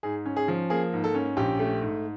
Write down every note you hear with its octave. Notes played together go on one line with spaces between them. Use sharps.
G#2 G#4
C#4
G#4
F3
A#3 G#4
G#2
A4
C#4
A#1 G4
A3
G#2